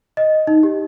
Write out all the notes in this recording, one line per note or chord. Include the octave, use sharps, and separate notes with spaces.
D#5
D#4
G4